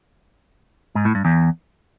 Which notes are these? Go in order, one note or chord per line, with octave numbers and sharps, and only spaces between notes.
G#2
A2
G2
E2